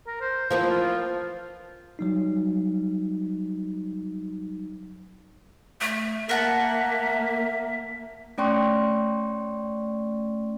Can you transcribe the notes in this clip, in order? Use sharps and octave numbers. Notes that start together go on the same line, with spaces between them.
A#4
C5
E3 F3 A#3 C4 C5 E6
F4
F#3 G3 D#4
A3
A#3 A#4 E5 F#5 A5
A3 C#4 D5 G5 C6 C#6